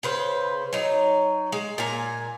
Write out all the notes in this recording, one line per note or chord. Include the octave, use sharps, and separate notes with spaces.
C#3 B4 C5
F#3 D#4
G#3
A#2 G#5 A#5